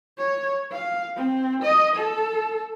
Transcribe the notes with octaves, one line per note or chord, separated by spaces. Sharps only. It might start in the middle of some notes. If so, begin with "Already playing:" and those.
C#5
F5
C4
D#5
A4